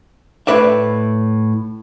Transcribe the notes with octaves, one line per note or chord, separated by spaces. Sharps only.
A2 B4 D5 E5